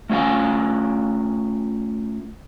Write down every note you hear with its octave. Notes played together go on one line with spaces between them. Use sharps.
A3 C#4 F4 F5 G#5